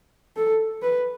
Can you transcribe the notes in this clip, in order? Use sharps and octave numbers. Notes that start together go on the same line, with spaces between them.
A4
B4